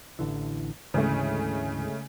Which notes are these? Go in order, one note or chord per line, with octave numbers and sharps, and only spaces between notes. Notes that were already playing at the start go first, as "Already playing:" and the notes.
A1 D3 E3
D2 G#2 C#3 E3 G#3 A3